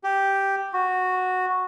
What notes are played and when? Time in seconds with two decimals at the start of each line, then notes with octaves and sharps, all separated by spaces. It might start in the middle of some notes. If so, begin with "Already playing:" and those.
0.04 G4
0.73 F#4